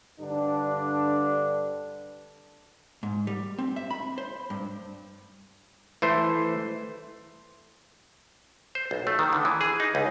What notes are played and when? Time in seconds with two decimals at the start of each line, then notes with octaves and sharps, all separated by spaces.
0.21 G2 D3 D4
3.03 G#2
3.27 G3
3.58 C4
3.76 E5
3.91 B5
4.18 C5
4.50 G2
6.02 E3 A3 C5
8.75 C5
8.91 B1
9.07 A3
9.19 D#3
9.33 D3
9.45 E3
9.61 G#4
9.80 D#4
9.95 C#2